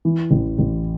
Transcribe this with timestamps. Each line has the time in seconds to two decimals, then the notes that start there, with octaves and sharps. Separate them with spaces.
0.05 E3
0.31 A1
0.59 A1